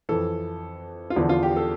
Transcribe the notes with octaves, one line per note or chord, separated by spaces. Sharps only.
F2 E3 A4
F4
E2 D3 F3 E4
F4
G4
A4